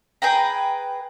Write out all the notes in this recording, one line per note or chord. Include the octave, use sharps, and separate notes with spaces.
G#4 B4 G5 A#5